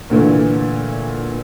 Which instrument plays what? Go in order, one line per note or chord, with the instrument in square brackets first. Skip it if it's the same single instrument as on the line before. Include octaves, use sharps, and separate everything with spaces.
[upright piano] A#2 D3 E3 A3